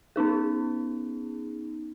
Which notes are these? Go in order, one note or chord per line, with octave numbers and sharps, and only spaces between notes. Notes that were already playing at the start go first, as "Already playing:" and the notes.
B3 C#4 D#4 G#4